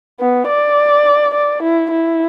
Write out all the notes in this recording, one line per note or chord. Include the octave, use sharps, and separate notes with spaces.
B3
D5
D5
E4
E4